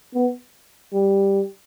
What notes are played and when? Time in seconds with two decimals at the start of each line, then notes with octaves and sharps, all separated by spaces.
0.14 B3
0.93 G3